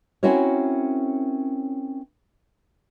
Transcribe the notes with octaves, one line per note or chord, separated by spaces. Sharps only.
C4 C#4 E4 F#4 A#4 C#5